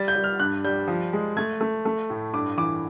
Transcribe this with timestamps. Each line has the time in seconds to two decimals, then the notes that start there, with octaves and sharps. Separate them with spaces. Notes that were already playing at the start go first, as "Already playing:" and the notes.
Already playing: G3 A6
0.08 G6
0.15 G3
0.24 F6
0.40 G2 F#6
0.64 G3 G6
0.88 F3
1.13 G#3
1.37 A3 G#6
1.61 A3
1.85 A3
2.10 A2
2.33 G2 D6
2.57 E3 D6